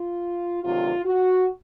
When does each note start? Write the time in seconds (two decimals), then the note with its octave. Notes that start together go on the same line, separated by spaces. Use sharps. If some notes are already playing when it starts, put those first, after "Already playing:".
Already playing: F4
0.64 D2 C3 D#3 F#3 F4
1.05 F#4